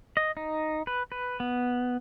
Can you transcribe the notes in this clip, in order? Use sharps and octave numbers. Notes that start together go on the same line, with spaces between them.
D#5
D#4
B4
B4
B3